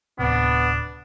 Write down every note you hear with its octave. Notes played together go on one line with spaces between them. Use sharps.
D1 C3 B3 D4